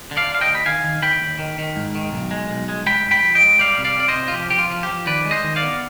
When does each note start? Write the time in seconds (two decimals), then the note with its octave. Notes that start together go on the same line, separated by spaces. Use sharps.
0.11 D3
0.17 D5 F5
0.28 D3
0.35 F5
0.41 D#5 G5
0.47 D2
0.55 B5
0.65 D#3 F5 G#5
0.84 D#3
1.02 D#3 G5 B5
1.21 D#2
1.39 D#3
1.58 D#3
1.76 G#2
1.95 D#3
2.12 B1
2.31 G#3
2.50 B1
2.69 G#3
2.86 G#3 G5 B5
3.05 G#2
3.11 G5 B5
3.23 F3
3.35 D#5 G5
3.41 G#3
3.59 G3 D5 F5
3.78 C3
3.85 D5 F5
3.97 C4 D5
4.08 C5 D#5
4.15 C3
4.28 F4
4.33 F3 G4
4.50 F3 G4
4.59 F4
4.71 F3
4.83 G4
4.89 F3
5.07 D#3 B4 D5
5.25 G#3
5.31 C5 D#5
5.44 D#3
5.56 D5 F5
5.62 B3